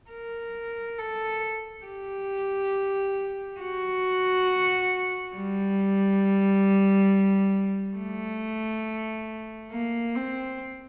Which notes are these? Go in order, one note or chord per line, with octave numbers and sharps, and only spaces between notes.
A#4
A4
G4
F#4
G3
A3
A#3
C4